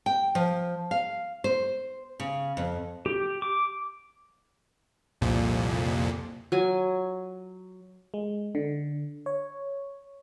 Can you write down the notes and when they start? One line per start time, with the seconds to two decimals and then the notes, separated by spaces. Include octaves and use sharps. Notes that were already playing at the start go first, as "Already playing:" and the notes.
0.06 G5
0.35 F3
0.91 F5
1.44 C5
2.20 C#3
2.57 F2
3.06 G4
3.42 D6
5.21 C2 F2 A#2
6.52 F#3 G#5
8.14 G#3
8.55 D3
9.26 C#5